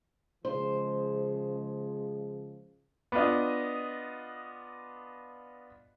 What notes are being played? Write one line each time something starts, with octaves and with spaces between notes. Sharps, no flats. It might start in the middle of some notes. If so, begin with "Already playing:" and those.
C#3 F3 G#3 C5
B3 D4 F4 D#5